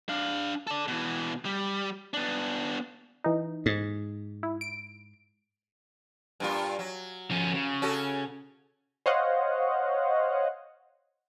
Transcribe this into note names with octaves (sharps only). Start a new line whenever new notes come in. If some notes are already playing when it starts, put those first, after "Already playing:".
D4 F5
A4 D5
B2 E3
G3
B3 D4
E3 D#4
G#2
E4
D7
G2 A#2 F4
F#3
F3 C#4
C#3
C#4 F#4 A4
C5 C#5 D#5 F5 F#5